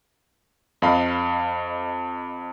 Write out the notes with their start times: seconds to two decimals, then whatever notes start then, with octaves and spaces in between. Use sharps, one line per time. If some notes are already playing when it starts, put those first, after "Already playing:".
0.82 F2 D#5 F5 B5